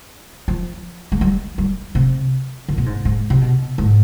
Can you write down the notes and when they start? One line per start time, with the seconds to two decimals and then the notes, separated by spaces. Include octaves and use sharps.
0.48 F3
1.12 G#3
1.21 G3
1.58 G3
1.95 C3
2.69 D3
2.78 B2
2.86 G#2
3.05 G#2
3.30 C3
3.41 B2
3.78 G#2